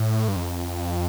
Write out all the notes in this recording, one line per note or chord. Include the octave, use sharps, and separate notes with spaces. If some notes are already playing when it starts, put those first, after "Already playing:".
Already playing: A2
G2
F2